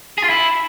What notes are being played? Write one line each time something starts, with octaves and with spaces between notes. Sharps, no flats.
G#4
F4
E4